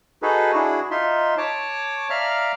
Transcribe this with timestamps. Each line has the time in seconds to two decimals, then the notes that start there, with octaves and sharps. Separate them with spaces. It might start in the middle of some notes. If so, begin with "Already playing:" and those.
0.22 D#4 F#4 G#4 A4 B4
0.53 D4 E4 F#4 G#4
0.91 D#4 F4 E5 C6
1.38 C#5 A5 D6
2.10 D5 E5 F5 A#5 F6